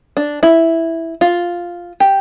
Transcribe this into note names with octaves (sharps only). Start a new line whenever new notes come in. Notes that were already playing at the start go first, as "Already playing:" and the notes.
D4
E4
F4
G4